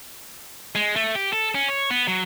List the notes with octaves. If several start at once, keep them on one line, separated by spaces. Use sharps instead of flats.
G#3
A3
G4
A4
C#4
C#5
B3
F#3